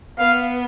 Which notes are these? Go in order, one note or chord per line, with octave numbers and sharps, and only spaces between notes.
B3 F5